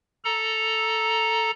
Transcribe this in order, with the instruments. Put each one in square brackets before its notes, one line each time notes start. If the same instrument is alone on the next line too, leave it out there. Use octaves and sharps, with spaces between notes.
[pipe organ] A4 A#5